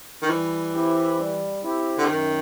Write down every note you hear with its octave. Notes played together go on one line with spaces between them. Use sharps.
D#3
E3 G3
C4 E4 G4
G3
C4 E4 G4
D3
F#2 D#3